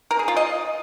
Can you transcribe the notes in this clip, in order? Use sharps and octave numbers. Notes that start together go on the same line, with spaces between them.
A#4
G#4
F4
D#5